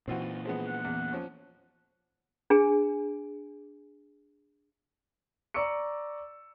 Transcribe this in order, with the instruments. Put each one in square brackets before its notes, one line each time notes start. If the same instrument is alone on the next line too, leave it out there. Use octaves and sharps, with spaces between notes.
[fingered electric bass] A#2 E3 [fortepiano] C4 F4 F#4
[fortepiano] F3 G#3 B3
[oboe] F#5
[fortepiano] E2
F3 C#4
[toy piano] D4 G#4 G#5
[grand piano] D5 A#5 C#6 D6 E6 C#7